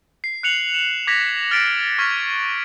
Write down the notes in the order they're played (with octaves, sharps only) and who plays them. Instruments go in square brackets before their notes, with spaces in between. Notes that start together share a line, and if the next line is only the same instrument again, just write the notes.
[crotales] C7
F#6 C#7 F7 F#7
E7 F#7
D6 G#6 A#6 B6 F7
F6 A6 B6 D7
C#6 F6 G#6 B6